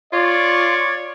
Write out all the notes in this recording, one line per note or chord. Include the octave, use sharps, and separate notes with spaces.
F4 C#5 D5 C#6